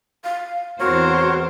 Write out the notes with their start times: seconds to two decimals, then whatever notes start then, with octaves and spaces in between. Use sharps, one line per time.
0.24 F5
0.80 E2 C4 F#4 A#4 C5 C#5